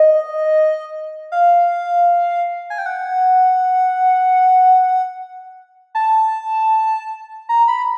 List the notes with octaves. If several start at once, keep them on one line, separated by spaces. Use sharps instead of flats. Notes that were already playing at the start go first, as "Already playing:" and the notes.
Already playing: D#5
F5
G#5
G5
F#5
A5
A#5
B5